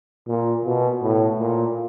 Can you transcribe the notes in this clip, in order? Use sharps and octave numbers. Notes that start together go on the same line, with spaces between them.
A#2
B2
A2
A#2